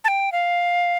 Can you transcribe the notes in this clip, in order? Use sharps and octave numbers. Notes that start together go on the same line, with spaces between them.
A5
G5
F5